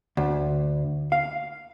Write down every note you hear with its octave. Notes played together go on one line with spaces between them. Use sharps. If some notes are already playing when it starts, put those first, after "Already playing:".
D2
F5